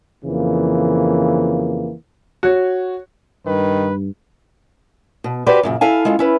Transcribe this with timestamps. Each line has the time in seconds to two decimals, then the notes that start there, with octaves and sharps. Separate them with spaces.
0.24 F2 C#3 E3 A#3
2.43 F#4 C#5
3.46 G2 D#3 B4
5.24 B2
5.46 F#4 G4 B4 C5 D5
5.63 F#2 A#2 C#3
5.81 E4 A4 F5 G#5
6.05 G#3 C#4 F4 A4
6.19 C#4 E4 B4